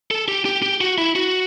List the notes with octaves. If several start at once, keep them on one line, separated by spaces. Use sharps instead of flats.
A4
G4
G4
G4
F#4
E4
F#4